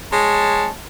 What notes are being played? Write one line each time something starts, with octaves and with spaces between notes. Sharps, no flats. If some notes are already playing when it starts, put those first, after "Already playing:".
G#3 C#5 A5